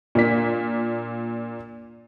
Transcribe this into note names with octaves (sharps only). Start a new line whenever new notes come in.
A#2 A#3 D4 B6